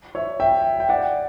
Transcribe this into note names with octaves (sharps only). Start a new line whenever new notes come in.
C#5 E5
E5 G5
G5
D5 F#5